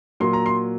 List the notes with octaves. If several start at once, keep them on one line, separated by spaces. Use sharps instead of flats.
A#2 F#3 A#3 C6
A#5
C6